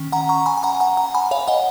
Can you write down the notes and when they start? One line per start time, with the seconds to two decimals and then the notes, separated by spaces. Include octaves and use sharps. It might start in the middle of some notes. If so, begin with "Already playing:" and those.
Already playing: D#3 C#4
0.12 F#5 A#5
0.29 A#5 C#6
0.46 G#5 B5
0.58 G#5
0.63 F#5 A#5
0.80 F#5 A#5
0.97 F#5 A#5
1.15 G#5 B5
1.31 C#5 F5
1.48 D#5 F#5